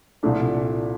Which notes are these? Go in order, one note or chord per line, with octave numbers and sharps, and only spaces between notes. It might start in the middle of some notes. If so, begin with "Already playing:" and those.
C2 A#2 F3 A3 D4